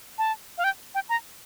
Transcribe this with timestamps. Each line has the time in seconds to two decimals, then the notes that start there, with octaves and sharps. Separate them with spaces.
0.18 A5
0.58 F5
0.64 G5
0.95 G5
1.09 A#5